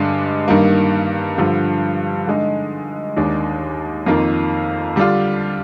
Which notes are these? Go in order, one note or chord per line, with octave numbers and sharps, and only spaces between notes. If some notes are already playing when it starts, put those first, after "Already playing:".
Already playing: G2 D3 G#3 D4
G2 D#3 G3 A#3
G2 D3 F3
D3 G#3 D#4
D#2 D#3 G#3 D4
F2 D#3 A#3 F4
D3 G3 D4 F4